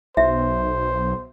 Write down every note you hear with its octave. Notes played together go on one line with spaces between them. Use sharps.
B1 C5 E5